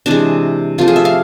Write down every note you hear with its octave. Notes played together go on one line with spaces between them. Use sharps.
C3 E3 G#3 D4
C3 F3 A3 F4
G#4
E5
F5